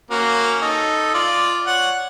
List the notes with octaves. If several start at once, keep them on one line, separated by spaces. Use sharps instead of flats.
A#3 C#4 F#4
D#4 A4
F4 D5
C#5 F#5